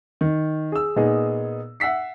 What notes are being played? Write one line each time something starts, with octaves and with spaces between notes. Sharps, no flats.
D#3
G#4 E6
A#2 B3 D#4 G#4
E5 F#5 E6 B6 C7